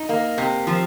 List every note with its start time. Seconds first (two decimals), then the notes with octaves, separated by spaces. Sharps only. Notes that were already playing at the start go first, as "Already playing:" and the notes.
Already playing: D#4
0.09 A#3
0.38 C3
0.67 F3